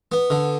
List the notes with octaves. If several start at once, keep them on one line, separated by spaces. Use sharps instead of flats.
B3
D3